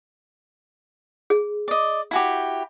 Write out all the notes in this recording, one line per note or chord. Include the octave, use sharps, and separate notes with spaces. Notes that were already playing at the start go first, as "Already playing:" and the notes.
G#4
D5 D#5
E4 F#4 G4